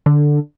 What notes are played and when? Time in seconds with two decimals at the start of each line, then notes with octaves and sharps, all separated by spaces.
0.06 D3